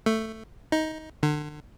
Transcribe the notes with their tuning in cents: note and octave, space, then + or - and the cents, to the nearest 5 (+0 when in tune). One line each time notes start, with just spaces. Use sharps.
A3 +10
D#4 +15
D3 +35